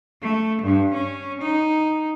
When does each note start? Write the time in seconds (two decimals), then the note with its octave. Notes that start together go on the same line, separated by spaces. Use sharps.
0.22 A3
0.62 G2
0.94 C#4
1.41 D#4